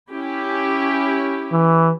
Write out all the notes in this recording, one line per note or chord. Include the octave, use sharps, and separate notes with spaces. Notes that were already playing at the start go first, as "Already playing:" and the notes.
C#4 E4 G4
E3